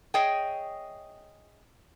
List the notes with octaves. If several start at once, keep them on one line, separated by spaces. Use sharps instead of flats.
G#4 C#5 D#5 E5 G5